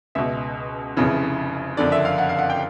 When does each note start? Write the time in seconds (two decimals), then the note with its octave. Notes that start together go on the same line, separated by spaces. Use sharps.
0.15 C#2 B2 E5
0.97 F1 F2 C#3 E3
1.77 F#1 F2 D3 D5
1.92 E5
2.05 F5
2.18 F#5
2.29 F5
2.39 F#5
2.50 G5